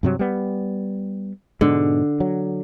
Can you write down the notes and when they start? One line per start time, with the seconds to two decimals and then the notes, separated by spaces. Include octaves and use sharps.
0.03 G2 C3 F#3
0.19 G3 B3
1.61 G#2 B2 D3 G#3
2.20 F#3